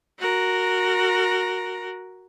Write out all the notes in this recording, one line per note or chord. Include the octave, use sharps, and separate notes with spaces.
F#4 A#4